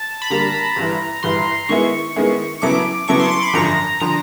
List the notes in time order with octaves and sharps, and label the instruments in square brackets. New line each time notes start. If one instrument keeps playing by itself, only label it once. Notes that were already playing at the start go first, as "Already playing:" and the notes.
Already playing: [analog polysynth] A5
B5
[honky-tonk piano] D3 G3 A#3 [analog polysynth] A#5
[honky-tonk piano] G1 G2 E3
[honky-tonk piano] G1 G2 E3 [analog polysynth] C6
[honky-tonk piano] D#3 G#3 B3 E4 G#4 [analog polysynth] C#6
[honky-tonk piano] D#3 G#3 B3 E4 G#4
[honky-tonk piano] C#3 F#3 B3 E4 A4 [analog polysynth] D6
[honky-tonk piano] C#3 F#3 B3 E4 A4 [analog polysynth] C#6
[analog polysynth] C6
C6
B5
[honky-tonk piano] G#1 F#2 D3 F3 [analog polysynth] A#5
[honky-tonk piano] D3 F3 [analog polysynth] A#5